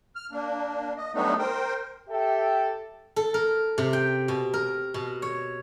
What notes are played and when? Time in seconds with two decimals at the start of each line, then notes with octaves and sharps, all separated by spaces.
0.16 F6
0.32 A#3 D4
0.97 D#5
1.14 F#3 G3 A3 B3 D4 D#4
1.39 A#4 C5 G5
2.09 G4 A4 E5 G5
3.16 A4
3.34 A#4
3.78 C3
3.93 G5
4.28 B2
4.54 A#4
4.94 B2
5.22 C#5